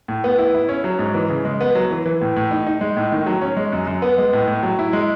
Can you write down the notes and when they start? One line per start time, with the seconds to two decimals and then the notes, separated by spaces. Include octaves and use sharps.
0.08 A2
0.24 B3
0.38 E4
0.54 E4
0.69 C#4
0.84 F#3
0.99 G#2
1.14 E3
1.30 C#3
1.45 G#3
1.61 B3
1.75 F#3
1.91 E3
2.06 E3
2.21 A2
2.36 A2
2.51 D#4
2.67 D#4
2.81 G#3
2.97 A2
3.12 D#3
3.26 F#3
3.41 C#4
3.57 G#3
3.73 F#2
3.87 F#2
4.02 B3
4.18 G#3
4.33 A2
4.48 A2
4.63 F#3
4.79 E4
4.93 G#3